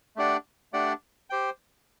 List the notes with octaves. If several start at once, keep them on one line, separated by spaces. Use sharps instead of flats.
A3 D4 G4 D5 F#5
A3 D4 G4 D5 F#5
G4 C5 G5